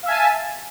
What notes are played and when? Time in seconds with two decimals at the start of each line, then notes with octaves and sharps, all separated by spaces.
0.03 F5
0.05 E5
0.08 G#5
0.10 A5